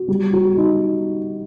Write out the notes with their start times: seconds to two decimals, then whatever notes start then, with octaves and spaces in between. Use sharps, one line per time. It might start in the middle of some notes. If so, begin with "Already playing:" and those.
Already playing: F#4
0.08 G3
0.33 F#4
0.57 D#4